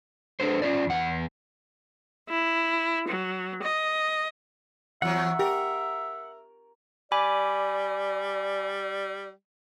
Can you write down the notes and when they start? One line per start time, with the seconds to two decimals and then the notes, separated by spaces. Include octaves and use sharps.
0.40 D4 A4 B4 C5
0.62 C#4 F4 D5
0.87 E2 F#5
2.29 E4
3.08 F#3
3.62 D#5
5.02 E2 F#3 E5 F#5
5.39 G4 A#4
7.12 G3 D5 G#5 B5 D6